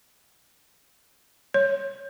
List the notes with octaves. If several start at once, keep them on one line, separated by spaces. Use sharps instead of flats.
C#5